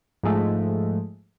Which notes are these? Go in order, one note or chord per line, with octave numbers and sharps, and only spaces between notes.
G#2 F3 G#3 A3